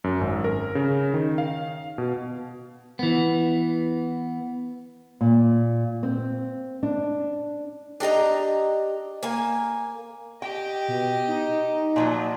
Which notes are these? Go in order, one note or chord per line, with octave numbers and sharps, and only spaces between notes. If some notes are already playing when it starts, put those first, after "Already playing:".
F#2
G#1
A#4
C#3
D#3
F5
B2
E3 B3
A#2
C4
D4
D4 G4 D#5 A#5
A#3 G#5
G4 D#5 G5
B2
D#4
A#2 F3 F#3